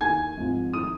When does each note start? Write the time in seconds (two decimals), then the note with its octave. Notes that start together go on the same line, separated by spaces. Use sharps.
0.01 D#2 D#3 G#5 G#6
0.37 G#1 G#2 F3
0.73 D#3 D#6 D#7